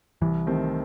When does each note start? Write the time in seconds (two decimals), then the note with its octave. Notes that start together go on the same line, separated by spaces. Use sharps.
0.21 C2 E3
0.46 C3 D#3 A3 C4